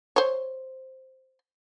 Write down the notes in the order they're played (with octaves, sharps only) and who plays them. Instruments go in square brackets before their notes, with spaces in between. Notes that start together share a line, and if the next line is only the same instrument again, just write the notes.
[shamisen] C5 C#5